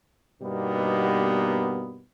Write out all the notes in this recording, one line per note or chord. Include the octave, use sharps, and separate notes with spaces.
G2 B2 G3 A#3 B3 D#4